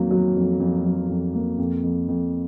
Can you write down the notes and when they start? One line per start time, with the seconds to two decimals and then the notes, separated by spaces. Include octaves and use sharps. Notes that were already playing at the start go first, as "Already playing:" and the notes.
Already playing: F2 D#3 F#3 A#3
0.11 F#3
0.35 F2
0.60 F2
0.84 F#3
1.09 F2
1.34 A#3
1.58 F2
1.83 F2
2.08 F2